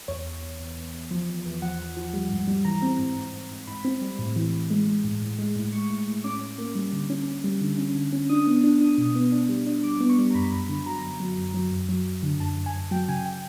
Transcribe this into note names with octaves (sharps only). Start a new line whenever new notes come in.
E2 C#5
E2
E2
E2
E2
E2
F3
E2
E2
F3 F#5
E2
F3
G3
G#2
G3
E3 A#5
C4
G#2
G#2
G#2
G#2
G#2 B5
C4
G3
A2
E3
E3
G#3
G#3
A2
A2
G#3
A2
G#3 C#6
A2
A2
C#4 D6
C#4
A#3
G3
D3
C#4
C#4
G3
D3
C#4
D3
C#4
D4 D#6
B3
D4
D4 D#6
B2
B3
D4
G3
D4
G3 D6
B3
C#6
G3
A#5
F#2 B5
F#2
D3
F#3 A#5
F#2
F#3
F#2
F#3
F#2
F#3
F#2
D3
F#2 A5
F#2
G#5
F#2
F#3 G5
C#3 G#5
G5